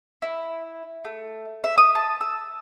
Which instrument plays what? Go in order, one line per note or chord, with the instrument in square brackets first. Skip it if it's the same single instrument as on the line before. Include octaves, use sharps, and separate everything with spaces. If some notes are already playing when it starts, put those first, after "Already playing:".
[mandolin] E4
A3
E5
D#6
A5
E6